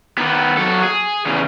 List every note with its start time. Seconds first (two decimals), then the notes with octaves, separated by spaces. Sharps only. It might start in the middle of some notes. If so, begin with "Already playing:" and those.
0.18 D#3 B3
0.57 F#3 A4
0.83 G#4
1.26 E2 C#3